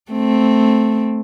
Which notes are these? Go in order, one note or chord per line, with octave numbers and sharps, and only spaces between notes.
A3 C4